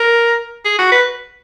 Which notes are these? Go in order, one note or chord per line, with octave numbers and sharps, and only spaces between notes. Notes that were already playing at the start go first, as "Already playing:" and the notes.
Already playing: A#4
G#4
F#4
B4